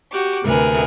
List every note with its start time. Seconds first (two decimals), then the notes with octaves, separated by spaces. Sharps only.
0.11 F#4 G4 D6
0.44 D2 C3 A#4 B4 G#5